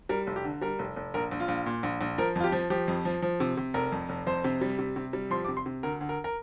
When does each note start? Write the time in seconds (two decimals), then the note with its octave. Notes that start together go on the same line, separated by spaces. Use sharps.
0.09 G3 A#4
0.27 F1
0.36 G4
0.44 D3
0.61 G3 A#4
0.79 F1
0.96 F1
1.14 A#1 A#4
1.31 A#1
1.40 F4
1.48 A#1
1.66 A#2
1.83 A#1
2.01 A#1
2.18 F3 A#4
2.36 F2 F4
2.44 G4
2.52 F3
2.70 F3 G4
2.88 F2
3.05 F3
3.22 F3
3.40 C3
3.57 C3
3.74 F1 A#4
3.92 F2
4.09 F1
4.27 F2 C5
4.44 C3
4.61 G3
4.79 C3
4.96 C3
5.13 G3
5.31 F3 C6
5.45 D6
5.48 C3
5.57 C6
5.66 C3
5.83 D2 A#4
6.01 D2
6.09 A#4
6.24 A#4